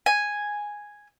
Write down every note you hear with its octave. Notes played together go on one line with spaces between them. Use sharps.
G#5